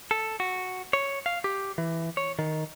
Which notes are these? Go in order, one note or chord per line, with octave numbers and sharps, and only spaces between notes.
A4
F#4
C#5
F5
G4
E3
C#5
D#3